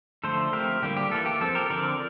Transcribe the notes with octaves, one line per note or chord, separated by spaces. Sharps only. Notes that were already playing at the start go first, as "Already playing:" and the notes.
D3 F3 A3 A4 C5
F3 A3 C4 G4 A#4
D3 G3 A#3 G4
G4
E3 A#3 A4
G4
F3 C4 A4
G4 A#4
D3 F3 C4 A#4 D5